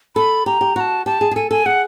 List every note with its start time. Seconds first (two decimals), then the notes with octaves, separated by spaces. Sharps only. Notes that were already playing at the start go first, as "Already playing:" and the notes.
0.16 A4 B5
0.46 G4 A#5
0.61 G4
0.76 F#4 A#5
0.80 A5
1.06 G4 A5
1.21 G#4
1.31 G#4
1.36 A4 G#5
1.51 A4 G#5
1.66 G#4 F#5